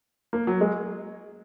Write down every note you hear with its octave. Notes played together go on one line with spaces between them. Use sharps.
A#3
F#3
G#3